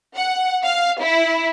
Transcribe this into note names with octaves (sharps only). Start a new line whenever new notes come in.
F#5
F5
E4